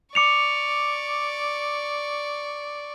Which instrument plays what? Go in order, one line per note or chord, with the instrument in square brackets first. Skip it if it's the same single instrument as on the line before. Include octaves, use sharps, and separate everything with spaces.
[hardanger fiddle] D5 C#6 [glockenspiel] D6 C#7 F7